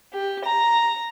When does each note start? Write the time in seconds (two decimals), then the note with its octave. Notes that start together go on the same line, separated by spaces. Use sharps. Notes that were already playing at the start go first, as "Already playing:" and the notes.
0.14 G4
0.44 A#5